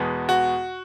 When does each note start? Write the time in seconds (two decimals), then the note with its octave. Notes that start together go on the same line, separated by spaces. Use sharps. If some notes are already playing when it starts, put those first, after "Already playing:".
Already playing: E2 B2 G#3 B3
0.29 F#4